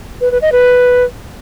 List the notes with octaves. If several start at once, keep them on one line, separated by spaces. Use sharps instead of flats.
B4
B4
D#5
B4